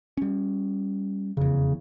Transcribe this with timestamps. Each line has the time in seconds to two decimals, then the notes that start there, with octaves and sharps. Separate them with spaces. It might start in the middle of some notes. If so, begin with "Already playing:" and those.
0.17 G3 C#4
1.37 F1 E2 C#3